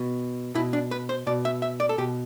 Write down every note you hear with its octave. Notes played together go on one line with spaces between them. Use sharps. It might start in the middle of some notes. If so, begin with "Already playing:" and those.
Already playing: B2
B2 E4
D4
B4
C5
B2 D5
E5
E5
D5
A4
B2 G4